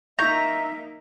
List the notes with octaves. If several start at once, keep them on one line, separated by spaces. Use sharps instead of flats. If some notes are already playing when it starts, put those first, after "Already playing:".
A#3 D#4 E5 A#5 C#6 G6